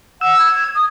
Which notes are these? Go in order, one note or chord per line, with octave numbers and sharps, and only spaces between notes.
F#5 E6
G#6
D#6